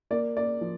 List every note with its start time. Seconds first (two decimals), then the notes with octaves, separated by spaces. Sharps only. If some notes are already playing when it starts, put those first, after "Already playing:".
0.11 A#3 D5
0.37 A#3 D5
0.61 F3